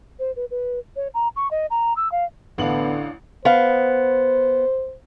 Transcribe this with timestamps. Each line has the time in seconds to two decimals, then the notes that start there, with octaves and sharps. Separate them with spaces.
0.19 C5
0.36 B4
0.51 B4
0.96 C#5
1.14 A#5
1.36 C#6
1.51 D#5
1.70 A#5
1.97 E6
2.12 F5
2.58 A1 D3 B3 D4 F5 F#7
3.45 B3 C5 F5